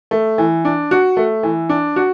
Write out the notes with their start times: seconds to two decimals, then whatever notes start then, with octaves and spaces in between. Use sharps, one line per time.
0.11 A3
0.38 E3
0.65 D4
0.91 F#4
1.17 A3
1.43 E3
1.69 D4
1.96 F#4